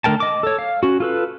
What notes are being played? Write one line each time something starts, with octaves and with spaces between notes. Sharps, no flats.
D3 A3 A#4 G5 A5
D#5 D6
A4 C#5
F5
C#4 F#4
F4 A4 B4